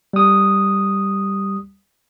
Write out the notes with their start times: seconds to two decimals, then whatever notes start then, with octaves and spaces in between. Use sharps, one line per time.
0.13 G3 D#6